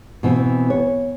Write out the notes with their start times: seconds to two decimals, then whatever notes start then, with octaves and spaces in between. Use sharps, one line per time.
0.23 B2 E3 C4
0.70 C#5